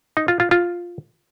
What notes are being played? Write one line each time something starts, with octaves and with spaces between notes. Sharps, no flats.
D#4
F4
F4
F4